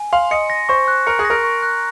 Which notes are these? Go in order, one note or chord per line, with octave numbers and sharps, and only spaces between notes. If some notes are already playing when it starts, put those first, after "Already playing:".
Already playing: G#5
F5 C6
D#5 C#7
A#6
C5 C#6
F#6
A#4 C#7
G#4
A#6
A#4
C#6
F#6